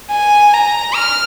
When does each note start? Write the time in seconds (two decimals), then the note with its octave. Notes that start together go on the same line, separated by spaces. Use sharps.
0.11 G#5
0.54 A#5
0.95 F6